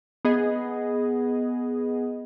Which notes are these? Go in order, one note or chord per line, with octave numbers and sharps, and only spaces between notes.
B3 G#4 D#5